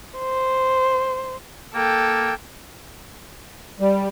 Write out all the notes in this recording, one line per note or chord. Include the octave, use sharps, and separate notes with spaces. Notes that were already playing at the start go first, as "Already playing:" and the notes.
C5
A#3 A4 G5
G3